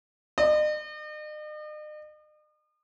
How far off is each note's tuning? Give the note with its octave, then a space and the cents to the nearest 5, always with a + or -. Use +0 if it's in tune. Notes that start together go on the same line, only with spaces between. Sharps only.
D#5 -45